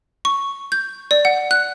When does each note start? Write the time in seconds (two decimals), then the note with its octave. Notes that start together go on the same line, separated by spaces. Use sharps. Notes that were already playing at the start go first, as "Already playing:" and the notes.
0.25 C#6
0.72 G6
1.11 D5
1.25 F#5
1.51 F#6